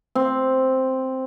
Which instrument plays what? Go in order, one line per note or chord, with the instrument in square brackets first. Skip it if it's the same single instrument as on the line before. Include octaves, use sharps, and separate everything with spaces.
[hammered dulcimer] C4